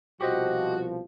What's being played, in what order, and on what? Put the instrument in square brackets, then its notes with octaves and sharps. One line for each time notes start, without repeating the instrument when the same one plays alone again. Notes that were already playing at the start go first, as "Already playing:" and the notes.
[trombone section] C2 B2 F3 [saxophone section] F#4 [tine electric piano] G4 C5 D#5